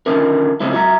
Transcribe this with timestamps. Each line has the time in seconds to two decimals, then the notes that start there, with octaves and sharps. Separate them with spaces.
0.06 D3 D#3 A#3 C#4 D4 A#4
0.60 C#3 G#3 A3 C4 E4
0.73 F#4 E5 A#5